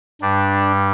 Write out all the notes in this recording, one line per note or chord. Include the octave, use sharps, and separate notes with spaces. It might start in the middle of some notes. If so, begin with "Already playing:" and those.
G2 G3 D4